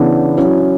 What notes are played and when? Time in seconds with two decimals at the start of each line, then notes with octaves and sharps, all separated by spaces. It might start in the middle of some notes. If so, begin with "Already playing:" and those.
Already playing: C#3 E3 B3 D4
0.37 F#3 C#4 E4